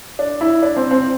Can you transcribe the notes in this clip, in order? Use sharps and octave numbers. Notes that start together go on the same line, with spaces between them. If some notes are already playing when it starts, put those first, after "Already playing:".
D4
E4
D4
C4
C4